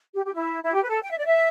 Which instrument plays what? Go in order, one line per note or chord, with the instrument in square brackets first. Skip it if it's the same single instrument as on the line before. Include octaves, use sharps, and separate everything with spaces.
[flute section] G4
G4
E4
E4
G4
B4
A4
G5
E5
D5
E5